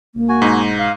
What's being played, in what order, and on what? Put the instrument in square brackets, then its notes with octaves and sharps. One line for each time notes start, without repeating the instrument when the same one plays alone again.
[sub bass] E1 [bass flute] A#3
[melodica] F#4 G#5
[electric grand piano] G#2 D#4
[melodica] F5